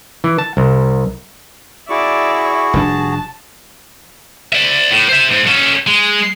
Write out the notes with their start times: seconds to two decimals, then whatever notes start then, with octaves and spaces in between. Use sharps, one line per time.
0.24 E3
0.38 A5
0.57 C2
1.90 E4 F#4 G#4 D5 E5 C#6
2.74 F1 G3 D4 A5
4.53 D5 E5
4.91 A2
5.09 C5 E5
5.33 G#2
5.47 C#4 A4
5.87 G#3